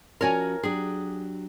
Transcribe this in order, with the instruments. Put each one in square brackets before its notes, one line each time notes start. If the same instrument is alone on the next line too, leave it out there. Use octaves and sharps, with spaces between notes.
[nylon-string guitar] F3 C#4 F#4 [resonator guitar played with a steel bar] A#4 C#5 G#5
[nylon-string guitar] F#3 D4 G4 [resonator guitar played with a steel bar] G#4